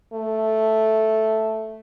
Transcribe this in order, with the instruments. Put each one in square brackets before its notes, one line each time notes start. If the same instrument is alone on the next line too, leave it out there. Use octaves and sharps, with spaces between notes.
[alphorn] A3